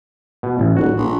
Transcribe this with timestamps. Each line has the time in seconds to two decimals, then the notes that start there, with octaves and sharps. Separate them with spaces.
0.43 B2
0.59 A1
0.77 D#1 F#4
0.97 A#1